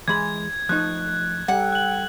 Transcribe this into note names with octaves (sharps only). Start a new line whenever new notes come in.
E3 G#3 B5 G#6
F3 A3 D#4 F#6
G3 A4 F#5 G5
F#6 F#7